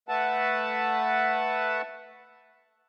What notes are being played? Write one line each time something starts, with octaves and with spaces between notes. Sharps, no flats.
A3 B4 E5 F#5 A5